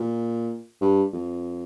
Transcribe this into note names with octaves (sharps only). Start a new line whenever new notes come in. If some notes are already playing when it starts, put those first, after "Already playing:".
Already playing: A#2
G2
F2